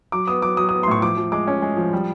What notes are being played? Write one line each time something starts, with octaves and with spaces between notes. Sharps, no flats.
F#3 D6
B3 D#6
F#3 D6
F#3 D#6
D#6
B3
C6
A2 C#6
F3 D6
F3
G#3 D6
C#4
G#3
F3
G3